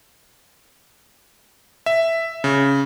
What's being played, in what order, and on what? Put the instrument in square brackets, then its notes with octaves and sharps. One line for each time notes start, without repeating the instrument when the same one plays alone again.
[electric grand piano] E5
C#3